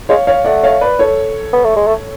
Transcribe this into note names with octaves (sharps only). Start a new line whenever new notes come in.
G#3 C#5 F5
C#5 F5
A3 D5 F#5
C#5 F5
B4 D5
A4 C#5
B3
A3
G#3
A3